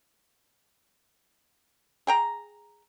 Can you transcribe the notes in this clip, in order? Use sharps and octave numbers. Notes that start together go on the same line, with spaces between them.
G#4 G5 A#5